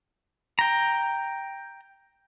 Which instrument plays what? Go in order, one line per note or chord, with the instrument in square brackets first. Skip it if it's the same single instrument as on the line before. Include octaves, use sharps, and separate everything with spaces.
[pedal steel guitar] G5 A#5